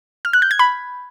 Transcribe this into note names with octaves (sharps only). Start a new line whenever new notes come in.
F6
F#6
G6
G#6
B5